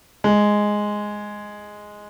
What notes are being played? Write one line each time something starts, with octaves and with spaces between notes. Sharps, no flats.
G#3